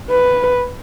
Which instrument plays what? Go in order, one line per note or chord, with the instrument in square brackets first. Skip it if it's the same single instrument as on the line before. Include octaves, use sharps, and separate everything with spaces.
[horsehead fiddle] B4